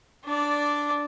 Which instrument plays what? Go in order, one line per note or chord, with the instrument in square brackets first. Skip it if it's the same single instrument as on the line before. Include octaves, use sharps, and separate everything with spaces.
[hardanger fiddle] D4 D5